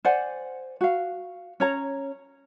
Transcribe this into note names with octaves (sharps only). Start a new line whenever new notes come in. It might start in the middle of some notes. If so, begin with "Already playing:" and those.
C5 D5 F#5 G#5
F#4 F5
C#4 C#5 A#5